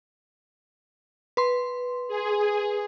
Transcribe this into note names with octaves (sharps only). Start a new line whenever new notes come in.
B4 C6
G#4